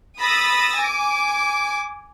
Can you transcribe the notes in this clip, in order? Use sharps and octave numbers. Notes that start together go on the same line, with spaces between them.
B5 D#6 E6 A6 A#6
G#5 D6